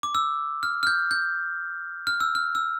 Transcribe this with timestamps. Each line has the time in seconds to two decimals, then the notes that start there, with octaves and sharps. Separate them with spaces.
0.03 D6
0.15 E6
0.63 F6
0.83 F6
0.87 G6
1.11 G6
2.07 F6
2.20 E6
2.35 F6
2.55 E6